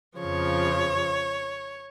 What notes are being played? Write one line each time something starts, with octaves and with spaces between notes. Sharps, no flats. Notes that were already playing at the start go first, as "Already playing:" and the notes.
F2 C#3 F3 C#5